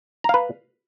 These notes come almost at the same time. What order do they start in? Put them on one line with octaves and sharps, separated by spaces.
A#5 F5 B4